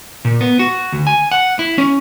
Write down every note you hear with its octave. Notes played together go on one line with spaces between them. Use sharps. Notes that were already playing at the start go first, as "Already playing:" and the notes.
A#2
B3
F#4
D2
G#5
F#5
E4
C#4